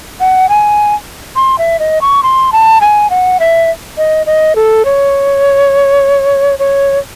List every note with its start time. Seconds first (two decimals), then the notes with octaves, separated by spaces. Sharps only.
0.20 F#5
0.49 G#5
1.36 C6
1.58 E5
1.79 D#5
2.01 C#6
2.23 C6
2.52 A5
2.81 G#5
3.10 F#5
3.40 E5
3.97 D#5
4.26 D#5
4.55 A4
4.85 C#5
6.59 C#5